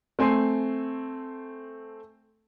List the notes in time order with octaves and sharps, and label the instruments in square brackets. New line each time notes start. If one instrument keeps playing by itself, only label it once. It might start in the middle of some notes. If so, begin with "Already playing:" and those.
[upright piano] A3 C4 G#5 C6 C7